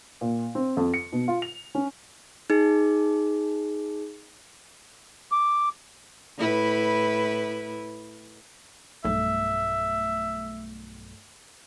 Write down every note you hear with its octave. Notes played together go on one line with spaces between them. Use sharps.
A#2
C4
F2
C#7
B2
F4
F7
C#4
D#4 G#4
D6
A2 E4 B4
B1 G2 A3 E5